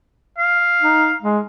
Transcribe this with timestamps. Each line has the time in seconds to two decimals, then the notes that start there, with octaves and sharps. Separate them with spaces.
0.38 F5
0.82 D#4
1.22 G#3